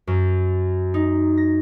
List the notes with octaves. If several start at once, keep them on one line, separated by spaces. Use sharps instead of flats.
F#2
D#4
A#6